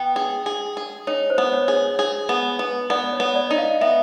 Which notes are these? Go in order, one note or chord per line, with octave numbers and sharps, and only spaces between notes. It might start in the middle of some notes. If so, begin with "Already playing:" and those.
Already playing: B3 G5
G#4
G#4
G#4
D#4 C#5
C5
B3
C#5
G#4
C#5
G#4
B3
B3
B3 D5
C#5
B3
D5
D#4
F5
B3 E5